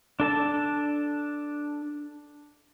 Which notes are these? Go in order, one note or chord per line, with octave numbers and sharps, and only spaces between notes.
D4 A4 A5